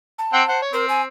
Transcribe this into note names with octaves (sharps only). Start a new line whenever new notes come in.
A5
C4 F#5 G5
C5 F#5
C#5
C4 A#4
G#5